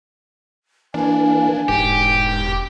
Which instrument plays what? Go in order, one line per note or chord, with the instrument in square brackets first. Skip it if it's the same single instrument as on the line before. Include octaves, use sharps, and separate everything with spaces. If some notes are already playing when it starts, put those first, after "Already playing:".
[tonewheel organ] E3 A#3 [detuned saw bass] D4 [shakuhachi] G#5
[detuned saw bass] E1 [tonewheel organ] G#2 [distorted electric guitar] G4